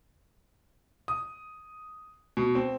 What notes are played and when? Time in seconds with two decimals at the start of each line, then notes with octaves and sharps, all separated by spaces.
1.08 D#6
2.37 B2
2.55 C4